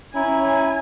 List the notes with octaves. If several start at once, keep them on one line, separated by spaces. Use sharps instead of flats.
C#4 E4 G#5 A#5